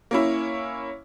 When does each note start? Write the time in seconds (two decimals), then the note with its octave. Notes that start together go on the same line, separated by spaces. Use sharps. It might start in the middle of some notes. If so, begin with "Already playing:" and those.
0.11 A#3 C#4 E4